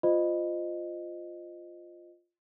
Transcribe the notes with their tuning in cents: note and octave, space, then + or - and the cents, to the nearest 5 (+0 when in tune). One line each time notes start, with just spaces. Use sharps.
F4 +0 C5 -15 D#5 -15